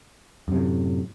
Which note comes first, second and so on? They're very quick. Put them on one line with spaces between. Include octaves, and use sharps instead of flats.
F#2 C3 A2